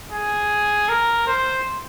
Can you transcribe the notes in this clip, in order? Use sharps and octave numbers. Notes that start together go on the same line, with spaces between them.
G#4
A#4
C5